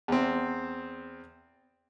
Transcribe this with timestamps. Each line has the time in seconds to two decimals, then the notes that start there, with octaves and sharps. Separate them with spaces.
0.08 E2 C4